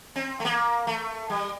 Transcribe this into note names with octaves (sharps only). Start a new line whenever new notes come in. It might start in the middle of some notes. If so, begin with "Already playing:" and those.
C4
A3
A#3
A3
G3